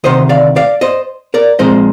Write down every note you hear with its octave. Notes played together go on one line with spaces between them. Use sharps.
D2 C3 D#3 C5 D#5
D5 F5
D5 F5
C5 D#5
A#4 D5
A#2 F3 G#3 C4 C5 D#5